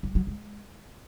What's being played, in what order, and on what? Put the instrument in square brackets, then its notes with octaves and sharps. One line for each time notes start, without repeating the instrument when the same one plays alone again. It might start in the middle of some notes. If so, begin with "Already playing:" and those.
[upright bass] F#3
F#3
G#3